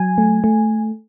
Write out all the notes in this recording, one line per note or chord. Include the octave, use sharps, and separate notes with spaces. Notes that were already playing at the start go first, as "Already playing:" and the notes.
Already playing: F#3 G#5
A3
A3